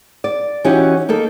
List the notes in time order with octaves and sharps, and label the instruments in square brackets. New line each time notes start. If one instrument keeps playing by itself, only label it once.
[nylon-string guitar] D5
E3 C#4 D#4 F#4 G4
A#3 D#4 A4